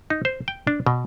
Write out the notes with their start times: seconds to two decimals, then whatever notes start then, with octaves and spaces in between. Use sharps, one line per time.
0.10 D#4
0.25 C5
0.48 G5
0.67 D4
0.87 B2